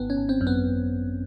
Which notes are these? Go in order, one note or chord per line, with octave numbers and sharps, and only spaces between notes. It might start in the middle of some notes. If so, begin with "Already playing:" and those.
Already playing: G#1 B3
C#4
G#1
C4
F#2
B3